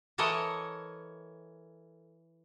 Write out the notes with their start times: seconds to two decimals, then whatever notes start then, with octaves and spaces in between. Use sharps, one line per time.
0.18 E3 A4 A#4 C#5 D#5